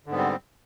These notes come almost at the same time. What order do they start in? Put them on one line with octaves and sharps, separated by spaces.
D3 G#2 B3 G3 C4